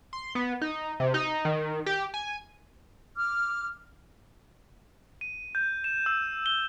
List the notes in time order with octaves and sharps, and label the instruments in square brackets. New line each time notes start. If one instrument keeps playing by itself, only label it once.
[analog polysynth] C6
B3
D#4
C3
D#4
D#3
G4
G#5
[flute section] D6 F6
[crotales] D#7
G6
E7
E6
G7